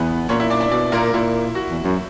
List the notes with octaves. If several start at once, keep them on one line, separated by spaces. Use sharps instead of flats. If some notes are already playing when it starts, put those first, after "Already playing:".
Already playing: E2 B3 B4
A#2 C#4 C#5
E4 E5
D4 D5
D4 D5
B2 D4 D5
A#2 A#3 A#4
A#2 E4
F#4
E2
F#2